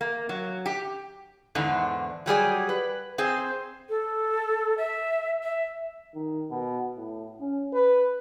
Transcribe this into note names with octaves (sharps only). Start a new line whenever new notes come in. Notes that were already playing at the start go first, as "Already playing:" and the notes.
A#3
F#3
G4
E2 G#2 D3 D4
F#3 G3 G#4 D5
B4
C4 G#4 C5
A4
E5
E5
D#3
B2
A2
C#4
B4